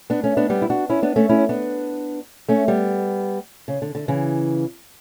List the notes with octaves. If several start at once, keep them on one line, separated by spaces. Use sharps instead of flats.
B3 D4
A3 C#4
B3 D4
G3 B3
E4
D4 F#4
C#4 E4
B3 D4
A3 C#4
C#4 E4
B3 D4
A3 C#4
G3 B3
C#3
D3
D3
C#3 E3